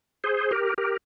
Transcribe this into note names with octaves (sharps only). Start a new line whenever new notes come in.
G#4 C5
G4 A#4
G4 A#4